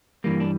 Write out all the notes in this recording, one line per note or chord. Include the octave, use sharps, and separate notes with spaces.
G2 E3 G3 A#3
D4